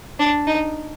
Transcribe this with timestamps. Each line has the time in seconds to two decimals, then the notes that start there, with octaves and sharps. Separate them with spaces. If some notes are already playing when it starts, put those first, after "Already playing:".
0.19 D4
0.47 D#4